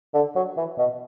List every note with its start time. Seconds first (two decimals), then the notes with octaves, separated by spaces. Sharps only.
0.14 D3
0.36 F#3
0.57 E3
0.78 B2